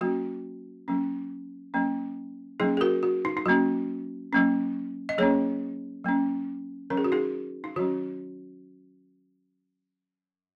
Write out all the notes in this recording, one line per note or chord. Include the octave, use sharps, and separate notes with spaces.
F#3 A#3 C#4 F#4
F#3 A#3 C#4
F#3 A#3 C#4
F#3 A#3 C#4 D#4 G#4
G#4
F#4 A#4
F#4
D#4
D#4
F#3 A#3 C#4 F#4
F#3 A#3 C#4
D#5
F#3 A#3 C#4 G#4 C#5
F#3 A#3 C#4
D#3 F#3 C#4 A#4
G#4
F#4
D#4 G#4
D#4
D#3 F#3 C#4 F#4